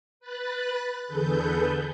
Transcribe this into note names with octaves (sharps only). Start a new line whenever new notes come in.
B4 B5 F#6 A6
E2 D3 G#4 A4 B4 G6